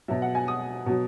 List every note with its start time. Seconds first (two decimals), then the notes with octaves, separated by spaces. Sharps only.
0.08 B2 F#3 E5
0.22 F#5
0.35 G#5
0.48 D#6
0.86 B2 F#3